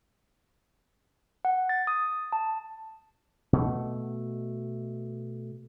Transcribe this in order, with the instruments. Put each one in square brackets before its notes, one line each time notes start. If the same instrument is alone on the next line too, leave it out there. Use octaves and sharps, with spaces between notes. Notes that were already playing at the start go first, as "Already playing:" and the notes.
[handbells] F#5
A6
D#6
A5
[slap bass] B2 A3